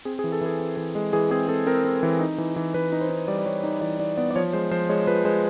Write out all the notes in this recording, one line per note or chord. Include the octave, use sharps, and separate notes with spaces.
C4 G#4
G#4
E3
A4
E3 G#4
C4
E3
G#3
E3 G#4
C4 G#4
C4 A4
C4 A#4
C4
E3
D#4
E3
E3
E3 B4
D#4
C5
D#4
G3 D5
D5
G3 C#5
D#4 D5
E3 D5
D#4 D5
B3 D5
D5
F3 C#5
G#3 C5
F3 C5
G#3 C#5
F3 B4
G#3 C5